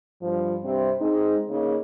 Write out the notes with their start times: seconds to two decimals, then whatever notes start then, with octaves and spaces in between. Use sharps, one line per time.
0.22 G2 F3
0.63 G2 C3 C4
1.00 G#3 C4 D#4
1.49 C#3 A#3 D#4 C#5